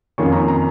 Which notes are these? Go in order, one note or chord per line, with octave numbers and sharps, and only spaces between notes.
F2 D#3 A#3 C#4 C#6
A#5
A#5